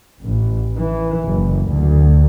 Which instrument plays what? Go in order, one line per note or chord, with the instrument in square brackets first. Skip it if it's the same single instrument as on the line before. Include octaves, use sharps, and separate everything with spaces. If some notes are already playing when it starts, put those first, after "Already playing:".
[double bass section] A1
E3
F#1
D2